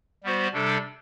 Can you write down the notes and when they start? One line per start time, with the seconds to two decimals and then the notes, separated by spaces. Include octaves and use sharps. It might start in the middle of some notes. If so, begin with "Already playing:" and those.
0.23 G3 B3 F#4 C5
0.53 C3 G3 D4 A4